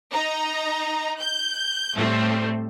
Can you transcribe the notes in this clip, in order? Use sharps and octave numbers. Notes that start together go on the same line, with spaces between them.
D#4 A#5
G6
A2 G3 A3 C4